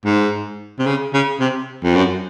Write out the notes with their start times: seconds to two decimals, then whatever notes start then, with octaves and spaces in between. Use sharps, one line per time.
0.05 G#2
0.79 C3
0.86 C#3
1.14 C#3
1.40 C3
1.84 F2
1.95 F#2